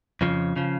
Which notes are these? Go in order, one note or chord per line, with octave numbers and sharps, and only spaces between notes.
F2 C#3 F3
C#3 F3